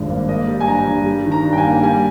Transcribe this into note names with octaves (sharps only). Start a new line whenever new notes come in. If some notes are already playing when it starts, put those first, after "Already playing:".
Already playing: G#1 G2 F3 G#3
A#3
A#3 D#5
G3
G#5
G2 A#5
G2
G3
D#3
A#5
G2
G5
G#5
A#3
G3 G#5